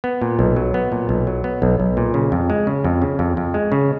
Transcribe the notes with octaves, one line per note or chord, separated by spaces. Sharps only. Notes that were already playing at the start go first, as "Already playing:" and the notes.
B3
A#2
B1
F#3
B3
A#2
B1
F#3
B3
B1
B1
A#2
C#3
F2
G#3
C#3
F2
C#3
F2
F2
G#3
C#3